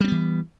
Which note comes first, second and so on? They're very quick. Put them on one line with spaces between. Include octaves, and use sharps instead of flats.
G3 C4 B3 E3